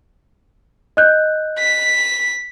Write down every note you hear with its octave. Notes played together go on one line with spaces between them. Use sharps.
D#5 F#6 G6
B6